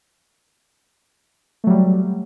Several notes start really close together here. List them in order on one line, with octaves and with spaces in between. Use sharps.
A3 F#3 G3